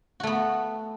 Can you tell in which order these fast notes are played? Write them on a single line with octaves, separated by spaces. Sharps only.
F#4 A3 B3